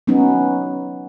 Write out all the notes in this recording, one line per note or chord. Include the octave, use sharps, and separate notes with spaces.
F#3 B3 C#4 D#4